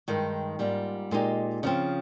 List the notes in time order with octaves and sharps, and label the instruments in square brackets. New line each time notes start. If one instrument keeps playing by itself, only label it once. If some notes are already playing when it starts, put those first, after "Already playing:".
[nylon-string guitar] G2 D#3 G#3
G#2 G3 A#3 F4
A#2 G#3 D#4 G4
C#3 F3 C4